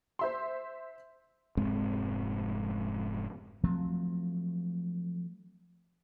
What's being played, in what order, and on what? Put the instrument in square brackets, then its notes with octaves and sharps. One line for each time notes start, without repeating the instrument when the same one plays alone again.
[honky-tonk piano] C5 E5 C6
[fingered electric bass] F1 G#2 G#3 C4
[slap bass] F3 F#3 A3 C4